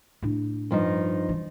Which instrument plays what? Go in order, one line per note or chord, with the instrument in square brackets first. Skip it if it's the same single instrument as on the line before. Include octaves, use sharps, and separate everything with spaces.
[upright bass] A2 D4
[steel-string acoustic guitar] G2 F3 D#4
[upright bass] E3